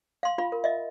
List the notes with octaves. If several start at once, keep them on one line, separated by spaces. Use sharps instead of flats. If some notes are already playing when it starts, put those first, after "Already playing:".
F5 C6
F4 F5 B5
A#4
D#5 E5